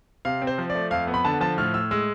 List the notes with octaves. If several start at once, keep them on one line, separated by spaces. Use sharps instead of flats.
C3 F5
C4
C5
F3
D5
A3
F2 F5
B3
B5
D3 A5
F3 A5
A2 F6
A2 E6
G#3 E6